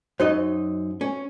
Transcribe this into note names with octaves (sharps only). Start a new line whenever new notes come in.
F#2 D#4 F#4 C5 D#5
C#4